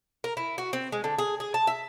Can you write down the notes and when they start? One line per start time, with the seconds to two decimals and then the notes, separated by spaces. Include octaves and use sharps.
0.24 A#4
0.37 E4
0.58 F#4
0.73 C4
0.92 G#3
1.04 D3
1.18 G#4
1.40 G#4
1.54 A5
1.67 E5